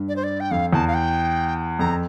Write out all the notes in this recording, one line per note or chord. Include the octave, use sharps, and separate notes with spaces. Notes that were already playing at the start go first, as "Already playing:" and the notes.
Already playing: G2
D5
C5
D5
G5
F2 F5
E2 A5
F5
G5
F2 A#5